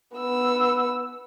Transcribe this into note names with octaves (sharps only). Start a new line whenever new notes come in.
B3 E6